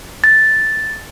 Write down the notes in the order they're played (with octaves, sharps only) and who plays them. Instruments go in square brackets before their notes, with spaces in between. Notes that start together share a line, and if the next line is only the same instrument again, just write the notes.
[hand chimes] A6